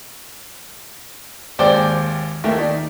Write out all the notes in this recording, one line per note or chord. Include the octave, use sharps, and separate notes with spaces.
G#1 D#2 C5 D5 G5 D6
D#2 A3 A#4 E5 G5
D#4 D5